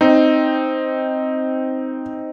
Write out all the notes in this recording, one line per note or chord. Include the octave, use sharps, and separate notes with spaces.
C4 D#4